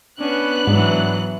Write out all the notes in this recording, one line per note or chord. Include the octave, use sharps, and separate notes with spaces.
B3 C#4 D4 F#6
G#2 E3 F#3